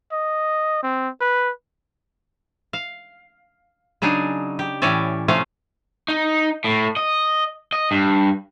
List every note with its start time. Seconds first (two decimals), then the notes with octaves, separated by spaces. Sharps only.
0.13 D#5
0.83 C4
1.21 B4
2.73 F5
4.02 C#3 F#3 D4 D#4 G#4
4.59 G4
4.82 A2 E3 C#4 C#5 D5 E5
5.28 C3 F3 A3 C#4 G#4 F5
6.08 D#4
6.64 A2
6.97 D#5
7.73 D#5
7.91 G2